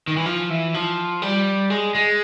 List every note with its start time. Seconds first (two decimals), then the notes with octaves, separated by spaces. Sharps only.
0.08 D#3
0.17 E3
0.26 F3
0.50 E3
0.74 F3
1.22 G3
1.70 G#3
1.95 G#3